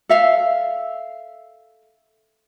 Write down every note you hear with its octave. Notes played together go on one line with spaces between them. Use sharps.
A4 E5 F5